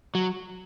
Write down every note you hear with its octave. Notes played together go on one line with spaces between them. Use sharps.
F#3